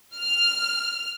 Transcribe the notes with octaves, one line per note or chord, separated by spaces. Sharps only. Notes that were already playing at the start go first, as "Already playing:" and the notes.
F6